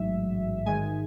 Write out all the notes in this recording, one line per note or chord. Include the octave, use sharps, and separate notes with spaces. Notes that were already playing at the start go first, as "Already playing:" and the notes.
Already playing: A1 G#2 F#3 E5
G#2 D#3 G#3 G#5